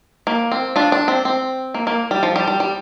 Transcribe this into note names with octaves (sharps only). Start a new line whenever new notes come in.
A#3
C4
D4 F4
D4
C4
C4
A#3
A#3
G3
F3
G3
G3
G3